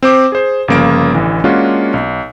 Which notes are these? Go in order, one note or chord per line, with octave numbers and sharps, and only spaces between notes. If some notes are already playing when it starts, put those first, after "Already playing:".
C4 C5 D6
G#4 C5
G1 C#3 F3 A#3 F5 D7
A1 D3 E3
G#3 A#3 C#4 D4 F4 F#4
B1